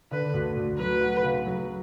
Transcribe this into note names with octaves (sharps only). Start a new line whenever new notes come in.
D3 B4
D2
D2
F#3 B4
F#4
C#3
F#3